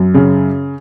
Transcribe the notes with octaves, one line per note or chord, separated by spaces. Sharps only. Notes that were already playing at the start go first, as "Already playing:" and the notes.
Already playing: F#2
C#3